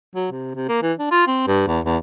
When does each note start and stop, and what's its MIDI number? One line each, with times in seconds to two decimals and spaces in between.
0.15 0.28 54
0.31 0.51 48
0.55 0.66 48
0.69 0.82 58
0.82 0.92 52
0.99 1.09 62
1.11 1.26 65
1.27 1.45 60
1.47 1.65 43
1.67 1.80 40
1.84 1.97 40